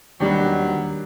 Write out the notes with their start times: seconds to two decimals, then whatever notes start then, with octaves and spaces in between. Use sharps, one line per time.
0.20 D#2 B2 D#3 F#3 G3 D4 G4